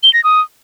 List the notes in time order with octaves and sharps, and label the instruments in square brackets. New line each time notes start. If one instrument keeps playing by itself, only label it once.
[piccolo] G7
A#6
D#6